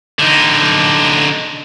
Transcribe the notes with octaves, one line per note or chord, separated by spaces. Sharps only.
D3 D#4